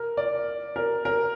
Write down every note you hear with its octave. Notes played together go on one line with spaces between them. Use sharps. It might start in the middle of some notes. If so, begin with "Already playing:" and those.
Already playing: A#4
D5
A#4
A#4